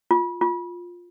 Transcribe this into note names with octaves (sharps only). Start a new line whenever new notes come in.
F4
F4